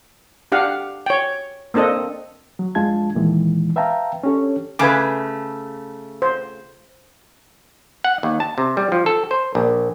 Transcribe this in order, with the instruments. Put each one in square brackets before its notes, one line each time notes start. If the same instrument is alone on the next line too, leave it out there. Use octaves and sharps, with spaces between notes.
[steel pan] D4 G4 F5 F#5
C#5 G5
A#3 C4 D4 A4 D#5
[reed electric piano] F#3
F2 G#3 D4 F4 A5 G#6
D#2 A#2 D#3 E3 G#3
B4 E5 F5 G5 A5 A#5
C#4 D4 G4 A4 C#5
[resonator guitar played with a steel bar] C#3 A3 [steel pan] B4 G#5 D6
[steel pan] C5
[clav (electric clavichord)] F#5
D#2
A5
C3
G3
F3
A4
C5
A#1